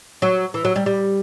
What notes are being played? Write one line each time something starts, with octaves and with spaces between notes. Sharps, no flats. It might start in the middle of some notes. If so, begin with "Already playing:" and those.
F#3
E3
F#3
G3
G3